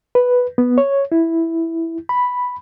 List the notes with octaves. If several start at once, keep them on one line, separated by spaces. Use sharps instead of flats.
B4
B3
C#5
E4
B5